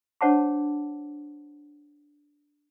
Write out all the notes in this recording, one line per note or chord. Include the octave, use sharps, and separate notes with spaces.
D4 C5 C#5 F#5 A5 D6